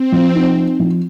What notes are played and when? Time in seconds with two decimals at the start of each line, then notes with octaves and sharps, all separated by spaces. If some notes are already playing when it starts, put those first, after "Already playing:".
Already playing: C4
0.12 F3
0.35 D#4
0.57 C4
0.79 F3